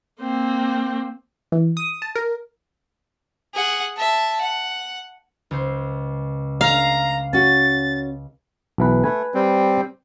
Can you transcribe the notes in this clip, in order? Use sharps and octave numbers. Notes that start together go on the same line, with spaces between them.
A#3 C4
E3
D#6
A5
A#4
G#4 F#5
E5 A5
F#5
C#2 C5
F5 A#5
C#4 F#4 A6
B1 E3 B4
A3 B4 G#5
G3 C4